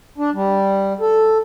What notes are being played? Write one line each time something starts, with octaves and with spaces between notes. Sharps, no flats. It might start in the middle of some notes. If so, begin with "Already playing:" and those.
D4
G3
A4